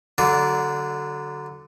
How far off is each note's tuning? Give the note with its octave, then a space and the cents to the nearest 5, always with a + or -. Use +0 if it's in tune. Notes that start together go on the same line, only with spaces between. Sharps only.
D3 +0 F#3 +25 D5 -15